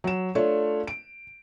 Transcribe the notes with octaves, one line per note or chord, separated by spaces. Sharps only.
F#3 E7
A3 D4 F4 C#5
D7